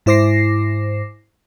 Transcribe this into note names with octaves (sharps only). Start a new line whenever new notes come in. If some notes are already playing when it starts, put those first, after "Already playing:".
G#2 E4 C5 D6 A#6 C7